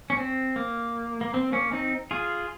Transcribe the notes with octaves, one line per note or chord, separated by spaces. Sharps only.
C#4
C4
A#3
A#3
C4
A#3 C#4
C4 D#4
F4 G#4